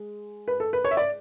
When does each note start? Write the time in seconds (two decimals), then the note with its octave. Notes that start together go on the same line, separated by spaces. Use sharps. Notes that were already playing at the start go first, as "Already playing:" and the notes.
Already playing: G#3
0.48 B4
0.60 A4
0.73 B4
0.84 C#5
0.91 E5
0.97 D5